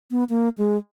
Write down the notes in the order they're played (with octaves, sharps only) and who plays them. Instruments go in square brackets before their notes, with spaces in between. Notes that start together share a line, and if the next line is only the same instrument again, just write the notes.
[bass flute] B3
A#3
G#3